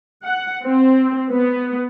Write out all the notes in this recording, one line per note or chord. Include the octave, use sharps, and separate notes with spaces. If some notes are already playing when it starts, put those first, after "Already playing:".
F#5
C4
B3